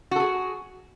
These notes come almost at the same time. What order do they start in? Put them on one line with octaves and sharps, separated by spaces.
F#4 A4 G#4